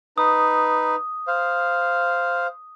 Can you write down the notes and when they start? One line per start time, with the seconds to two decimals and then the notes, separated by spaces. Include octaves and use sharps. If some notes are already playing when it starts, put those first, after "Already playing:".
0.18 D#4 B4 D#6
1.27 C5 F5